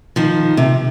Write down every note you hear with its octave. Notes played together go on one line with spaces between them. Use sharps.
D#3 F3
C3